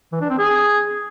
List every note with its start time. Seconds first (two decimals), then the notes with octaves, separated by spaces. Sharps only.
0.12 E3
0.21 D4
0.30 C4
0.39 G#4